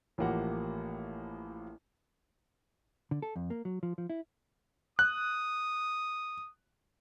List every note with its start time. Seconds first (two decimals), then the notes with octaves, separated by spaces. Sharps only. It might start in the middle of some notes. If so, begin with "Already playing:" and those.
0.18 A1 A2 F3 A#3 G4 F#5
3.11 D3
3.22 A4
3.36 F2
3.50 A#3
3.65 F#3
3.83 F3
3.98 F3
4.10 E4
4.99 D#6 F#6